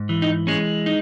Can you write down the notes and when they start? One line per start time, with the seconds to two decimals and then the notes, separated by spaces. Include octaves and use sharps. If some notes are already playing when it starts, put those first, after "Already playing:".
Already playing: G#2
0.09 E3
0.22 D#4
0.47 G#3 C#4
0.86 D#4